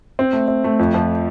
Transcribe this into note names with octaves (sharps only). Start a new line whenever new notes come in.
C4
A3
C4
A3
F2
F3